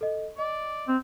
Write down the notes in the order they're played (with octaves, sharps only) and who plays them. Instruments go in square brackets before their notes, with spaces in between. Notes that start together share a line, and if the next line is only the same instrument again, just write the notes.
[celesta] A4 D#5
[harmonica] D5 [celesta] D#5
[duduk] C4